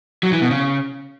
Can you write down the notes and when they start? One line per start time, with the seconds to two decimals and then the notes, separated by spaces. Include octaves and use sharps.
0.23 F#3
0.32 E3
0.42 B2
0.51 C#3